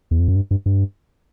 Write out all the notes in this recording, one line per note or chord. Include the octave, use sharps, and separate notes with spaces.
E2
F2
F#2
G2
G2
G2